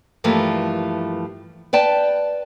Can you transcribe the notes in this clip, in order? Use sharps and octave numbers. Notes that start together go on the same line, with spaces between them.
G2 E3 F3 A3 A#3
B4 D5 G5 A5